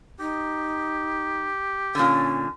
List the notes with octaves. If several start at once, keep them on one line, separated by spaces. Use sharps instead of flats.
D#4 G4
A#2 D3 C#4